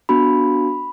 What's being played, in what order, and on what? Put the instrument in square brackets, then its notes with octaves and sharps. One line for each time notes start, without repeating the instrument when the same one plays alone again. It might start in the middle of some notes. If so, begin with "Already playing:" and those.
[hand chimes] B3 D4 F#4 B5